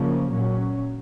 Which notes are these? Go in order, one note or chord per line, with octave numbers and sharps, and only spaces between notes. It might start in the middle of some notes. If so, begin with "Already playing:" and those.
Already playing: C#3 F3 A#3 C#4
A#2 F#3 C#4